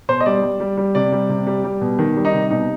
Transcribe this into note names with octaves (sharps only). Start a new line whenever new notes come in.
B2 C5
D#5
G3 D5
G3
G3
G3
C3 D5
G3
C3
G3
G3
B2
D#3
G3
D#4
C3
B2 D#4